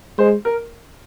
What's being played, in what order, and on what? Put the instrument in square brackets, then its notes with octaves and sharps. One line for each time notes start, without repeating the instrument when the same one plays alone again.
[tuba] G#3 [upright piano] C5
[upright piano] A#4